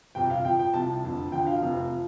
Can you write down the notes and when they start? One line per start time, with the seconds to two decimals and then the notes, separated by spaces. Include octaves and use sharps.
0.15 G1 F2 C3 G5
0.30 F5
0.45 F2 F3 G5
0.59 G5
0.74 C2 C3 F3 A5
1.03 F1 F2 D3
1.32 D2 D3 F3 G5
1.47 F5
1.61 F1 F2 C3 F3
1.90 F3